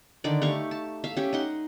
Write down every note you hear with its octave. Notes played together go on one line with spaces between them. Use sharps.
D3 D#3 D#4 D5
A3 G4 F5 C#6
A5
E5 F5
C#4 G4
D#4 F#5 C6